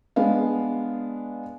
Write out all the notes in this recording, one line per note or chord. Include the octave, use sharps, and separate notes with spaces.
G#3 B3 D4 F5